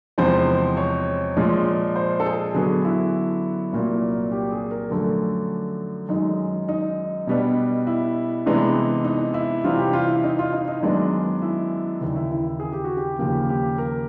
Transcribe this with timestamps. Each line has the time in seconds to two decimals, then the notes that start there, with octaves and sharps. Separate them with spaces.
0.18 E2 C3 F3 G#3 C4 C5
0.77 C#5
1.37 A#2 F3 G#3
1.96 C5
2.20 A4
2.25 G#4
2.54 F#2 D3 F#3 B3 D4 G#4
2.85 E4
3.73 C2 A#2 F#3 A#3
4.32 G4
4.52 G#4
4.71 A#4
4.91 F#2 D3 F3 A3 D4
6.09 F#2 D#3 G#3 D#4
6.69 D#4
7.27 B2 G3 B3 D4
7.87 E4
8.46 C3 E3 G#3 B3 D4
9.05 D#4
9.34 E4
9.64 C3 E3 G3 C4 F4
9.79 G4
9.93 F4
10.08 E4
10.24 D#4
10.39 F4
10.53 D#4
10.68 D#4
10.83 F#2 D#3 G#3 B3 D4
11.42 E4
12.01 D#2 C#3 E3
12.16 E4
12.31 E4
12.60 G#4
12.72 G4
12.84 F#4
12.97 G4
13.19 D#2 C#3 F3 A#3 G4
13.49 G4
13.78 A#4